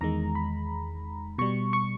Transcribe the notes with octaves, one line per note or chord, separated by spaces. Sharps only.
E2 D#3 G#3 A#5
B5
B2 G3 C#6
C#6